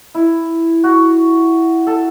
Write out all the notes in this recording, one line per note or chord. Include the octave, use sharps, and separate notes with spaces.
E4
F#4
A4